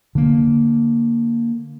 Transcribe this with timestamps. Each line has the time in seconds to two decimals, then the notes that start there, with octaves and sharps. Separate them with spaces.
0.15 D3 A#3